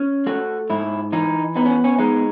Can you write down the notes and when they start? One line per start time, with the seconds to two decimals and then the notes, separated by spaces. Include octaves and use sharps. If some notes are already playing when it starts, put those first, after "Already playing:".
Already playing: C#4
0.26 A3 F#4
0.70 G#2 E4
1.12 E3 D#4
1.55 B3 D#4
1.65 C#4
1.84 C#4
1.98 G#3 D#4